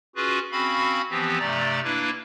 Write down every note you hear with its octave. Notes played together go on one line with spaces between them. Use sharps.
C#4 F4 F#4 G#4 B4
C4 C#4 F#4 F5 B5
E3 F3 B3 C4 G4
G2 C3 A3 D5 A#5 A6
A#3 D4 E4 B4